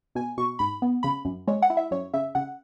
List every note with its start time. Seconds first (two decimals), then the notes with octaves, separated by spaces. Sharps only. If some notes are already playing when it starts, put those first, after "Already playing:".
0.15 B2 G#5
0.38 B2 C#6
0.59 G#2 B5
0.82 B3
1.03 C#3 B5
1.25 F#2
1.47 G#3 C#5
1.62 F#5
1.70 E4
1.77 E5
1.91 F#2 C#5
2.13 C#3 E5
2.35 C#3 F#5